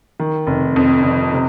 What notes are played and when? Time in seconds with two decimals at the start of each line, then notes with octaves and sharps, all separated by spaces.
0.20 D#3
0.47 F1
0.76 F2
1.03 F1
1.32 C3